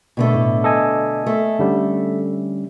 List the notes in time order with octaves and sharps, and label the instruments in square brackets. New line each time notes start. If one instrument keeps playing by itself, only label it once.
[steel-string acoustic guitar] B2 D3 A3
[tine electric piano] A2
A4 D#5 G#5
[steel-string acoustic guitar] A3
[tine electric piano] D3 G3 C#4